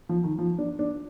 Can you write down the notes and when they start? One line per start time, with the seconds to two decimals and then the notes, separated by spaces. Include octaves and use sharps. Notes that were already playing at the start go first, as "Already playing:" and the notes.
0.09 F3
0.24 D#3
0.38 F3
0.58 D4
0.79 D4